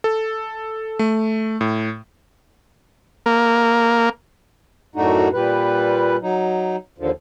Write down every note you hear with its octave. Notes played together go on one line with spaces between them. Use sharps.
A4
A3
A2
A#3
F#2 A2 A3 D4 D#4 F#4
A#2 G3 B4
F#3 D#4
D#2 D3 F3